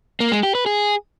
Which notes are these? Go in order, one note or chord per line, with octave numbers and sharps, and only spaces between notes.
A#3
G#3
G4
B4
G#4